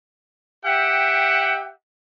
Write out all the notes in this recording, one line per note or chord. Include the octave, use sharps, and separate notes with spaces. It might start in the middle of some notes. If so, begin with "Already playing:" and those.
G4 E5 F#5 G5